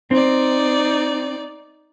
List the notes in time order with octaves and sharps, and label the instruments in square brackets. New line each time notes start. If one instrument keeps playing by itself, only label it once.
[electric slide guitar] C4 [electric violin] D#4 D5